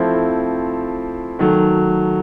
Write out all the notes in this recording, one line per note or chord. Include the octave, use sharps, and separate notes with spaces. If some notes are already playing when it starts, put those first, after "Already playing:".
Already playing: F3 A3 C4 E4
D#3 F#3 A3